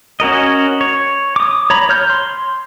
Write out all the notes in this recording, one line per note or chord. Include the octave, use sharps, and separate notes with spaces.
C#4 F#4 A#4 D#5
C#5
D6 D#6
C#5 A#5 B5
C#5 F6 G6
C6